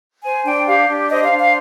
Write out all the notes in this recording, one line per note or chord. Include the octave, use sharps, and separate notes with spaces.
C5 G#5
D4 G5
G4 F5
D4
C5 D#5
F5
D4
F5